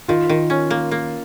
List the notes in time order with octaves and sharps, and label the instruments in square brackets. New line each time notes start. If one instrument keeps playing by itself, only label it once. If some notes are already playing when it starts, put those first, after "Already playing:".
[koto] D#3 [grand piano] F4
[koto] D#3
C#4
A#3
A#3